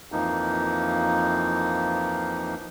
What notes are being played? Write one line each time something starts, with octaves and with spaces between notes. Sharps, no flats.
F2 E3 F3 A#3 D#4